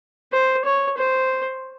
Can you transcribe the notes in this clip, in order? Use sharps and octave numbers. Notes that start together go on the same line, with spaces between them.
C5
C#5
C5